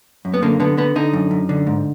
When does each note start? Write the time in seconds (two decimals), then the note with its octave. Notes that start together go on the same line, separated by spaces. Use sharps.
0.25 F#2
0.34 B3
0.42 D3 A#3
0.60 D3 B3
0.77 D3 B3
0.96 D3 D#4
1.13 F#2
1.31 F#2
1.49 D3
1.67 G#2